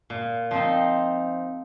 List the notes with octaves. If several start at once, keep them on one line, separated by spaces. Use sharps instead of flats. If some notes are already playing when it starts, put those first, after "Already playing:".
A#2
F3 C4 D#4